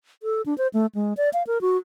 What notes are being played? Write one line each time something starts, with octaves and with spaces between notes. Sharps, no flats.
A4
D4
C5
A3
G#3
D5
F5
A#4
F#4